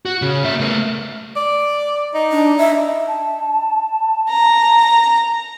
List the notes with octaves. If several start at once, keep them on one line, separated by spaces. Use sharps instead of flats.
F#4
C#3
A#3 E5
A3 A#4
D5
D#4
D4
E5
A5
A#5